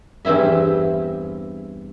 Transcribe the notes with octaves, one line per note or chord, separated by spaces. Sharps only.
E2 G2 C4 E4 E5